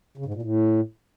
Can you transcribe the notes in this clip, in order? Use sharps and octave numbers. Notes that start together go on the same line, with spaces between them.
C#3
G#2
A#2
A2